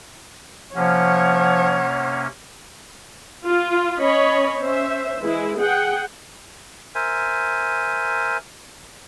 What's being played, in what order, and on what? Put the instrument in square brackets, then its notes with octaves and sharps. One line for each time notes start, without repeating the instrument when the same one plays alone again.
[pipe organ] C3 A#3 C#4 [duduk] F3 [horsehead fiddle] C#5 [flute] F#5
[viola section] F4
C#4 C#5 D#5 B5
C#4 C5 E5
E3 G#3 E4
G#4 F#5 G5
[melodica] A#4 C5 E5 G#5